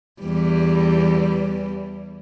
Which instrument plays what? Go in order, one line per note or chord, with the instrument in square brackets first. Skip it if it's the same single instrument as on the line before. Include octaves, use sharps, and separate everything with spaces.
[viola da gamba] E2 E3 G3